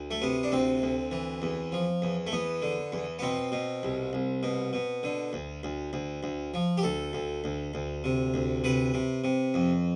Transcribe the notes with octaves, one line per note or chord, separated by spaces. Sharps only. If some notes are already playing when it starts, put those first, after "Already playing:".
Already playing: D2
A3
C3 B3
D4
D2 C4
D2
E3
E2
F3
E2
A3
E2 B3
D3
E2
B3
B2 C4
B2
C2
C2
B2
B2
D3
D2
D2
D2
D2
F3
G4
D2 A4
D2
D2
D2
C3
D2
C3 B4
C3
C3
F2